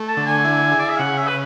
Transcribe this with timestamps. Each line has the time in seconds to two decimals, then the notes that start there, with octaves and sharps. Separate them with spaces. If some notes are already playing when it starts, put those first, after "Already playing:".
Already playing: A3
0.08 A5
0.17 D3
0.26 G#5
0.45 E4
0.72 G#4
0.79 D5
0.90 E5
0.99 C#3 F#5
1.18 E5
1.28 B4